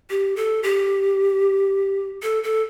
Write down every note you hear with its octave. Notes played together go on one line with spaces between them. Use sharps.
G4
A4
G4
A4
A4